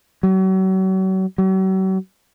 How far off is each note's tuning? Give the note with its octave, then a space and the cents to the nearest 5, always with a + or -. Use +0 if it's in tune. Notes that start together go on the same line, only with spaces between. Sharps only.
F#3 +40
F#3 +45